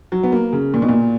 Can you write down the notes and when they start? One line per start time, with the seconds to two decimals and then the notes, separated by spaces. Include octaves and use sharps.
0.12 F#3
0.23 B3
0.32 A#3
0.53 C#3
0.74 A#2
0.82 B2
0.89 A#2